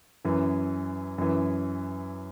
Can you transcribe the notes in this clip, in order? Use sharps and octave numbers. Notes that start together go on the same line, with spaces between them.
F#2 E3
F#2 E3